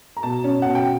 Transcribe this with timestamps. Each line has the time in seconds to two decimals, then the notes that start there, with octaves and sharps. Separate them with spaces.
0.17 A#5
0.23 B2 A5
0.44 C#4
0.62 B2 F#5
0.75 G5